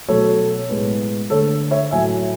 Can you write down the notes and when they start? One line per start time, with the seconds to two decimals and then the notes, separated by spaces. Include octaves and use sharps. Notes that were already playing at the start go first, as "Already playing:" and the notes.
0.08 B2 F#3 A3 A4 C#5
0.69 A2 G#3 B3
1.30 D3 A4 C#5
1.34 A3
1.71 C#5 E5
1.91 A2 F#3 A3 E5 G#5